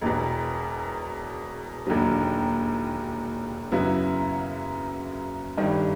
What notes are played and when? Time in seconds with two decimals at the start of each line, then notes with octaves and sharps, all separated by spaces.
0.01 E1 E2 B2
1.87 E1 D#2 D3 F#3
3.72 F#2 C#3 F#3 B3 E4
5.57 G1 G2 D#3 G3